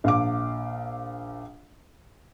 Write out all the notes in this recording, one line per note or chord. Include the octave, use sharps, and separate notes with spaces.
A#1 F5 D6